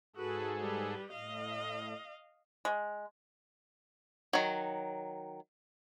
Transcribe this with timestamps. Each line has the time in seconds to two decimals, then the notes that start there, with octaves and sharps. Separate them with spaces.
0.16 G#2 F#4 G#4 A4 B4
0.61 G3 B4
1.11 A2 D#5 F5
2.65 G#3
4.33 D#3 F#3